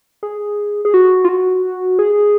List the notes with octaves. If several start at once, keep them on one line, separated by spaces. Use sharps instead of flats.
G#4
G#4
F#4
F4
F#4
G#4